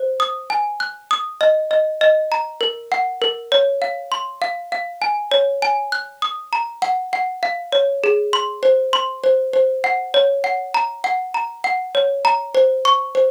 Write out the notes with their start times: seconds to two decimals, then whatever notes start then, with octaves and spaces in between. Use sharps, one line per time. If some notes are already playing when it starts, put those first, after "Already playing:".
Already playing: C5
0.20 D#6
0.50 G#5
0.80 F#6
1.11 D#6
1.41 D#5
1.71 D#5
2.01 D#5
2.32 A#5
2.61 A#4
2.92 F#5
3.22 A#4
3.52 C#5
3.82 F5
4.12 C6
4.42 F5
4.72 F5
5.02 G#5
5.32 C#5
5.62 G#5
5.92 F#6
6.22 D#6
6.53 A#5
6.82 F#5
7.13 F#5
7.43 F5
7.72 C#5
8.04 G#4
8.33 C6
8.63 C5
8.93 C6
9.24 C5
9.53 C5
9.84 F#5
10.14 C#5
10.44 F#5
10.74 A#5
11.04 F#5
11.34 A#5
11.64 F#5
11.95 C#5
12.25 A#5
12.55 C5
12.85 C#6
13.15 C5